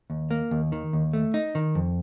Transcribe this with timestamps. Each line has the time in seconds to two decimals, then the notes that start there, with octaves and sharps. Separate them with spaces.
0.10 D#2
0.31 A#3
0.51 D#2
0.72 D#3
0.93 D#2
1.13 A3
1.34 D#4
1.55 D#3
1.75 F2